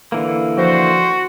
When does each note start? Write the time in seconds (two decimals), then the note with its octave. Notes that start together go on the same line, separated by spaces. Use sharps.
0.12 D3 E3 A#3
0.58 F3 F#4 C5